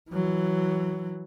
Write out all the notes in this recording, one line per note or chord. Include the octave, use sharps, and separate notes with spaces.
E3 F#3